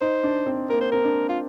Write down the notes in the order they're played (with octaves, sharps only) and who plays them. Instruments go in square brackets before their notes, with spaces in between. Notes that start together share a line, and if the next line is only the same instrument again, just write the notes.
[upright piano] D#4 [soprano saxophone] C5
[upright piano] D4
C4
[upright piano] A#3 [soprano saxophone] A#4
[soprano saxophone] C5
[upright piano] C4 [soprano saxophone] A#4
[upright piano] D4
[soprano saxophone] F4